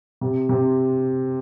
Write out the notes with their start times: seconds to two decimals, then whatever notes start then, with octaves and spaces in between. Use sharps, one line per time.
0.21 C3
0.49 C3